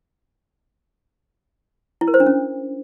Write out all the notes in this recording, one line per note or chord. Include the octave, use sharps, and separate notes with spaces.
E4
A#4
C5
D4
C#4